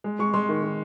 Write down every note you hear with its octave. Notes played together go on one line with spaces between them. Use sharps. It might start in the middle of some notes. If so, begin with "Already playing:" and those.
G#3
G#3 C#6
G#3 C6
D#3
D#3